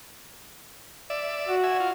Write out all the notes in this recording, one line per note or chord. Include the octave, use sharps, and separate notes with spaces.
D5 E5
F#4
E5 G#5
F4